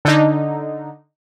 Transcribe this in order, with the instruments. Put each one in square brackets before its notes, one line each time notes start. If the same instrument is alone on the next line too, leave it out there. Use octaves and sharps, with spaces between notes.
[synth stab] D3 D#4